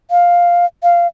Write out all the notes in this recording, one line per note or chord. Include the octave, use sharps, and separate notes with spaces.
F5
F5